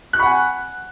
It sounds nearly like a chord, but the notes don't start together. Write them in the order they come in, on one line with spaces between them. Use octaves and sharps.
F#6 C#6 B5 F#5 G#5